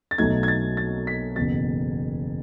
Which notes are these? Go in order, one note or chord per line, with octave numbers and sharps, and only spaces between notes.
A6
B1 B2 F#3 A3 D#4 G#6
G#6
A6
A6
B6
F#1 E2 B2 A6